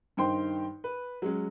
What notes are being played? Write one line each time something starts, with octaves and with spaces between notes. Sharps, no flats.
G2 D#3 D#4 C5 G5 C6
B4
F#3 G#3 C#4